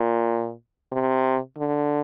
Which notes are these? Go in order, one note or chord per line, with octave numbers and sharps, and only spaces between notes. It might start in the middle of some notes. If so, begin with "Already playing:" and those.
Already playing: A#2
C3
D3